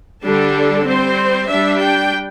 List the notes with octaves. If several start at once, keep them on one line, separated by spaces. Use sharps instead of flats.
D3 G3 D4 A4
G3 C4 C5
G3 D4 E5
G5